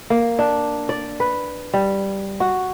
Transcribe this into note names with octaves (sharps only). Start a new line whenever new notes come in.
A#3
D4
D5
B4
G3
F#4